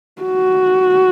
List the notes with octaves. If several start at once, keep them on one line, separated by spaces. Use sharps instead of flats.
F#4